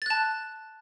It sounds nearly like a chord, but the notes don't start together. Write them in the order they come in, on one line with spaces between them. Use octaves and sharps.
A6 F#6 A5